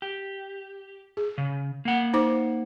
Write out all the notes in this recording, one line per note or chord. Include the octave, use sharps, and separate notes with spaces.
G4
G#4
C#3
A#3 F#5
D#4 C5 D6